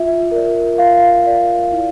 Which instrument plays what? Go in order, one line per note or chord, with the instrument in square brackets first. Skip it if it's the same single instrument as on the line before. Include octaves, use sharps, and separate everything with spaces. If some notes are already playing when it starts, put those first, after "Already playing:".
Already playing: [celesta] F4 E5
A#4 D5
F4 F5
A#4 D5
E4